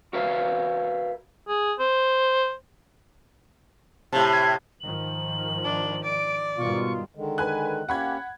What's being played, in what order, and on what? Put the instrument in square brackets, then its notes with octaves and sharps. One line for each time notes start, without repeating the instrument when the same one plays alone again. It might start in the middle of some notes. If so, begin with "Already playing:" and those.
[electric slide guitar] F#4 A#4 B4 E5 F5
[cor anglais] G#4
C5
[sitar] A2 C3 [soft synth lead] A5
[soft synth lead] G#6
[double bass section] G#2 D#3 F3 [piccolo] F#7
[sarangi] D4
[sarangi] D5 [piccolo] D7
[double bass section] G#2 D#3 G3 [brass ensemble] B2 F4 [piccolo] C#6
[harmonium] D3 D#3 G#3
[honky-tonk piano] B4 G#5 F#6
[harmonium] A#3 C#4 G4 [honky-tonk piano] F#5 B5 G#6